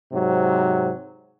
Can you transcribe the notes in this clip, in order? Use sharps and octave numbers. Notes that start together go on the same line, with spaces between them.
G#2 C3 F#3